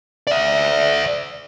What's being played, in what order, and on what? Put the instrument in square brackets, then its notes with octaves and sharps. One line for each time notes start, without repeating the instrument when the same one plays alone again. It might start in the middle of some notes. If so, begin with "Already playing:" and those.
[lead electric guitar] D5 E5